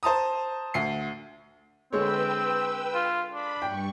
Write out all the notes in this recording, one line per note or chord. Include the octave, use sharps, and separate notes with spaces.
C5 A5 A#5 D#6
D2 C7
D3 G#3 C4 B4 C#5 G5 E6
F4
D4 B5
G2 G5 C#6